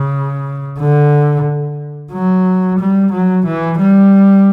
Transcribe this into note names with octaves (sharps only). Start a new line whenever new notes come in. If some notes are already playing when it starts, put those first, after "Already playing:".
Already playing: C#3
D3
F#3
G3
F#3
E3
G3